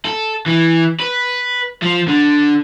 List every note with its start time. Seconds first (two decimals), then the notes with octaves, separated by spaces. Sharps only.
0.05 A4
0.46 E3
1.00 B4
1.82 F3
2.08 D3